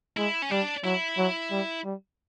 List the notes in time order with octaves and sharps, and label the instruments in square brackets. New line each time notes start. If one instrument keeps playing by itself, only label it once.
[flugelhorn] G#3 [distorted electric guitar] E4
[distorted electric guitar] C#4
[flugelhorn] G3 [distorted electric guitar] D4
[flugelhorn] F#3 [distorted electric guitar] E4
[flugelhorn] F#3
G3
G3